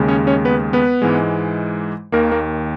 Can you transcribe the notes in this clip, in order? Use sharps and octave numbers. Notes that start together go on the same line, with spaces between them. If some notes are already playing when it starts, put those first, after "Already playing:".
Already playing: D#2 C#3 G#3
C#4 C#5
C#4 C#5
B3 B4
B3 B4
G#2 E3 G#3
D#2 D#3 A#3 A#4
A#3 A#4